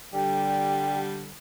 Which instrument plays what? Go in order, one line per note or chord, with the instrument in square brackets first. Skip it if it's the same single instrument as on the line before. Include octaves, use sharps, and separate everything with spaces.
[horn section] D3 G3 [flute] G5